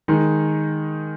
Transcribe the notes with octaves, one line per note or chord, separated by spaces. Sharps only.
D#3 G#3 D#4